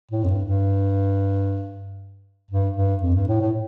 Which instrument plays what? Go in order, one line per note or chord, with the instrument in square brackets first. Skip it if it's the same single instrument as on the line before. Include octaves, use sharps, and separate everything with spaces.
[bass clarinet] A2
F2
G2
G2
G2
G2
F2
G2
A2
A2